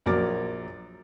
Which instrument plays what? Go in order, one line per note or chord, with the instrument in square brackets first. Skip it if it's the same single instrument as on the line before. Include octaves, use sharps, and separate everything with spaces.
[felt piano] A#1 F#3 A#4 D6 A6